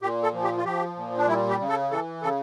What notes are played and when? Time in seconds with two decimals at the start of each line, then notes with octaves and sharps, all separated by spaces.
0.01 A#2 G4
0.23 A4
0.33 F3
0.43 G4
0.57 F4
0.65 F3 G4
0.96 A#2
1.18 D4
1.28 G3 E4
1.49 G4
1.59 C#3
1.69 A4
1.91 E3 A4
2.22 C#3 A4